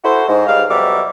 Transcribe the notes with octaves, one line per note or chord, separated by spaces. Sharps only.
E4 F#4 A4 C5
G#2
C#2 G3 G#3 F5
F2 B2 F#3 G3 E5 D6